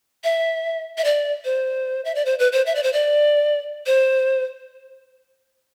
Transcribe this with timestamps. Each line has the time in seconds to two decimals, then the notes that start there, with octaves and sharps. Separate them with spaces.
0.24 E5
0.98 E5
1.04 D5
1.45 C5
2.05 E5
2.15 D5
2.25 C5
2.39 B4
2.52 C5
2.66 E5
2.75 D5
2.83 C5
2.93 D5
3.86 C5